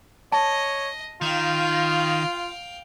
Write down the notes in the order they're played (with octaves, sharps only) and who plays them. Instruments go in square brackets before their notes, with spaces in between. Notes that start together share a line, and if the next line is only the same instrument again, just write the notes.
[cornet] C#5 [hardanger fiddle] D#5 [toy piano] A5
[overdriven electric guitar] D#3 [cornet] F4 [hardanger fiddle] F5 G5